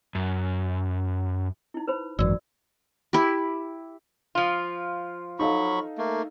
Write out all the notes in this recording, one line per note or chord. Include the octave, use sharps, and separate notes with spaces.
F#2
D#4 E4
B4 C5 B5
G#1 F#2 E3 F#4 D5 E6
E4 G4
F3 F4
F#3 D#4 A4 F5 B5 C#6
A3 A#3